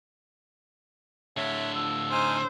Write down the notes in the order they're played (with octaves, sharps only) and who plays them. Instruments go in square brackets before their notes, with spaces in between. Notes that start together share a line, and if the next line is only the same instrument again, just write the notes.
[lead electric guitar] A2 D3 [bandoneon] C#5 E5
[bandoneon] F3 [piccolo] E6
[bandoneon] D#4 G#5 F6 [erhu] C5